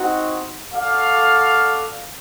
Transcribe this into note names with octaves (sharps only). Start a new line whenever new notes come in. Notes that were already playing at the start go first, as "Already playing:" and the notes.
Already playing: C4 D#4 F#4
F#4 A4 D5 F5